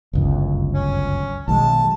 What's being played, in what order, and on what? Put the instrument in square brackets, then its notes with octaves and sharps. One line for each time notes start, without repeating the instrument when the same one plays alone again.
[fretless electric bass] G1 C#2 F#2
[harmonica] C#4
[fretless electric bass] B1 D#3 G#3 [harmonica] A5